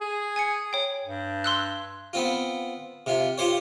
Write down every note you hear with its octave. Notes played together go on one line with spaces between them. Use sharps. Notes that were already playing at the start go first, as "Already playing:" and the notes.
G#4
G#5 G#6 C#7
C#5 G5
G2
C6 E6 F#6
B3 C4 F4
C3 F4
F4 G4 C5 C#5